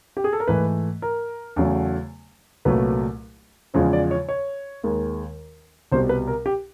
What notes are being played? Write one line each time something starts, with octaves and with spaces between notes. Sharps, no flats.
G4
G#4
A4
A#4
G#2 E3 A3 B4
A#4
E2 C#3 F#3 A3
C2 A#2 F#3 A3 B4
E2 C#3 F3 G#3 C5
D5
C#5
C#5
D#2 D#3 G#3
C2 B2 G3 C5
B4
A#4
G4